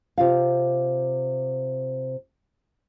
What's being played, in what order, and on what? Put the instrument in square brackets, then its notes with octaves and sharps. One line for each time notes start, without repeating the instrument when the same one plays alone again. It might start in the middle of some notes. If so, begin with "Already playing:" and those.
[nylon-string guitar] C3 F4 F5